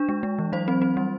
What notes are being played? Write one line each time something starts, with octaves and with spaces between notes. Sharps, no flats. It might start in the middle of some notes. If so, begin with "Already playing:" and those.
Already playing: D4
G#3
G#3
E3
F#3 C5
C4
C4
G3